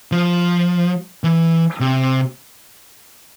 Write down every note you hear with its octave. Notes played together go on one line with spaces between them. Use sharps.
F3
E3
C3